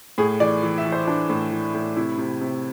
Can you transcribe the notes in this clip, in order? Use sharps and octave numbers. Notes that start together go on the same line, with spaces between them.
A2 G#4
E3 D5
E3
E5
E3
C5
E3 D4
A2
E3
A2
C3 E4
C3
C3